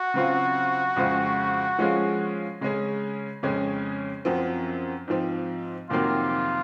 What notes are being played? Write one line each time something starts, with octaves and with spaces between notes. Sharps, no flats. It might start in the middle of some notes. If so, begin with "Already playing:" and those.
Already playing: F#4
C#3 F#3 C4 F4
F2 C#3 G#3 C4 F4
F3 G#3 C#4 F4 G#4
C#3 G#3 C#4 G#4
F2 C#3 G#3 C#4 G#4
F#2 F3 C4 F#4
G#2 F3 C4
F2 C3 D#3 F#3 A#3 F4